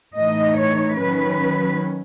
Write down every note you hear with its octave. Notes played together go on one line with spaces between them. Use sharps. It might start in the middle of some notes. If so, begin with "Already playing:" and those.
A2 E3 A3 D#4 D#5
C#5
D#3 F#3 C#4 B4